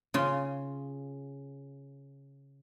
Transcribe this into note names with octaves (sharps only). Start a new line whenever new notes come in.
C#3 F4